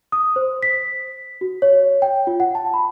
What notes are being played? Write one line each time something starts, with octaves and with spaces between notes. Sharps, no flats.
D#6
C5
B6
F#4
C#5
G5
F4
F#5
A5
B5